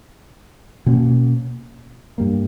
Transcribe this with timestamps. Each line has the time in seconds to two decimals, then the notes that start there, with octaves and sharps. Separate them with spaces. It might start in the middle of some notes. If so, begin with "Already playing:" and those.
0.86 B2 A#3 C#4
2.18 G2 G3 A#3